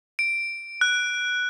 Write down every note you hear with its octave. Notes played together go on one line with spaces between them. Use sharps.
D7
F#6